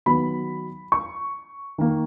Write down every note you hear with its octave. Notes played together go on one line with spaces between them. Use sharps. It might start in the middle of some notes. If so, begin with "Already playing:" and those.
D#3 F#3 B3 B5
C#6
D#3 A#3